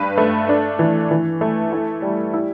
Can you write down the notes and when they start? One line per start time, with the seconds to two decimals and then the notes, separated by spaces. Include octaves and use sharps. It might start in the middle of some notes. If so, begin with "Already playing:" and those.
Already playing: G2 B4
0.17 A3
0.49 D4
0.79 E3
1.11 E3
1.41 A3
1.72 E4
2.02 G3
2.34 E4